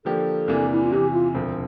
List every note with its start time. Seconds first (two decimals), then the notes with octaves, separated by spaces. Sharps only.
0.05 D3 F3 A#3 D4 G4 A4
0.48 E2 C3 E3 A#3 D4
0.72 E4
0.82 F4
0.92 E2 C3 E3 G4
1.12 F4
1.34 E1 D2 D3 F3 C4